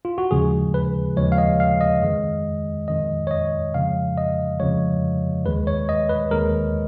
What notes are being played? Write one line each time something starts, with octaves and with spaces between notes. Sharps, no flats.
F4
F#4
D#2 C#3 F3 G#3 G#4
B4
D#2 C#3 F3 G#3 C#5
F5
D#5
F5
D#5
F2 D#3 G#3
F2 D#3 G#3 D#5
C#5
D#5
F2 C#3 F3 G#3 F5
D#5
F2 C#3 F3 G#3 C#5
D#2 D#3 G#3 B4
C#5
D#5
B4
D#2 D#3 G#3 A#4